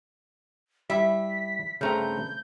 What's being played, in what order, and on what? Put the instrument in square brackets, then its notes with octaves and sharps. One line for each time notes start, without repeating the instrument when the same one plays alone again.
[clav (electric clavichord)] G3 E4 [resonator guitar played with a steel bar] E5 [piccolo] B6
[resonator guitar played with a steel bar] G2 A#5 [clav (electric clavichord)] C#3 A3 C4 [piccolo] G6